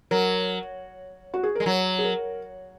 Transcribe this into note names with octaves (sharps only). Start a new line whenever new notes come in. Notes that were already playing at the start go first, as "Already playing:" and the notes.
F#3 A#4
F#4
G#4
G#3 A#4
F#3 C#5
G#4
A#4